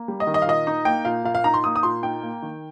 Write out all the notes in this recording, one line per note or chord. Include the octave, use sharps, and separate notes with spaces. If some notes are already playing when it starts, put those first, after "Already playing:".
Already playing: A#3
G3
D#5
D#3
D#5
F5
A#2 D#5
D#4
A#3 G5
A#2 F5
A#2 F5
F5
D#4 A#5
C6
A#3 D#6
D#6
A#2 C6
D#4 G5
A#3
D#3